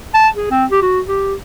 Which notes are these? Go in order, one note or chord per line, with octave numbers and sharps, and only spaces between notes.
A5
G#4
C4
G4
F#4
G4